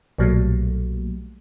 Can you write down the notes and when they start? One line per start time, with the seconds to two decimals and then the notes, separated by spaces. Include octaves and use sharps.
0.18 B1 A#2 F#3 G3 A3 A#3